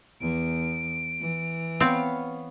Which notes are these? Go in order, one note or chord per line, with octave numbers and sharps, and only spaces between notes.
E2 D7
E3
B3 C4 C#5 F5